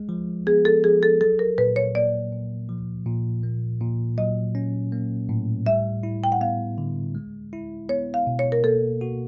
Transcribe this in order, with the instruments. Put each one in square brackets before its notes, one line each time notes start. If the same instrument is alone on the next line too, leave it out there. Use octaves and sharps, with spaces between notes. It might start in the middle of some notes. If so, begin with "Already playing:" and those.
Already playing: [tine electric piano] G#3
F3
[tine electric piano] B3 [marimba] G#4
[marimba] A4
[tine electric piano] F3 [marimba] G#4
[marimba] A4
[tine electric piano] F#3 [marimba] A4
[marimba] A#4
[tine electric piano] A#2 [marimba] B4
[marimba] C#5
[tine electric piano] A#3 [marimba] D5
[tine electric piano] A#2
F3
A#2
A#3
A#2
[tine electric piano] F#3 [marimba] D#5
[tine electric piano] C#4
A#3
A2
[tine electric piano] G3 [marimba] E5
[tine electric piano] E4
[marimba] G5
F#5
[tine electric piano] B3 [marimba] F5
[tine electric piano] D3
G#3
E4
[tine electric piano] B3 [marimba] C#5
[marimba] F5
[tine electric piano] B2
[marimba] C#5
A#4
[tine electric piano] A#3 [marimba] A4
[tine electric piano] F#4